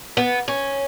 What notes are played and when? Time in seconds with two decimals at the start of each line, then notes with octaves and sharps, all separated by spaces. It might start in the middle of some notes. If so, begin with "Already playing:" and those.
0.17 B3
0.48 C#4